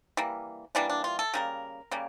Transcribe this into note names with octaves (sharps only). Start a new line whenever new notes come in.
E3 G3 A#3
E3 G3 A#3 D4
D4
F4
A4
C#3 G3 A#3 A#4
C#3 G3 A#3